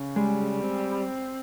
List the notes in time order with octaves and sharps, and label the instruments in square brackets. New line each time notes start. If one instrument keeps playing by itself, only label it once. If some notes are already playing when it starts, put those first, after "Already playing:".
Already playing: [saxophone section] C#3
[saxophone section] G3 [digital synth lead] G#3
[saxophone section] C4